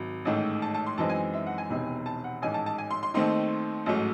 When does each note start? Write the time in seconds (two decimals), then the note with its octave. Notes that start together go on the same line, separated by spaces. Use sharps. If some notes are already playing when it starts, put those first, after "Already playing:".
Already playing: G#1 F#3
0.25 A1 G#2 D#3 A3
0.62 A5
0.74 A5
0.86 C6
0.98 F#2 E3 G#3 C4 D#4 A5
1.09 G#5
1.34 E5
1.47 F#5
1.58 G#5
1.70 E1 E2 C3 D#3
2.06 A5
2.24 F#5
2.42 A1 G#2 D#3 G#5
2.54 A5
2.66 A5
2.78 G#5
2.91 C6
3.03 C6
3.14 D#2 D#3 A3 C4 D#4 C6
3.86 A1 G#2 F#3 A3